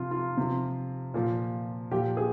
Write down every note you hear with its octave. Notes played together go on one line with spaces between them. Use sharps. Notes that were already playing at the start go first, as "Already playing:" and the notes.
Already playing: C3 F3 F4
F4
C3 F3
A#2 F3
A#2 F3 G4
G#4